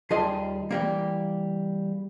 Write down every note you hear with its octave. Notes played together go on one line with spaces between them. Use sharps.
D#2 G3 F4 G#4 D#5 A5
E3 G3 A#3